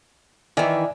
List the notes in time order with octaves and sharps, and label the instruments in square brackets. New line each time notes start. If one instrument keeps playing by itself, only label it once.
[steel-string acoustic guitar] D#3 E3 [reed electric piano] D5 E5 G#5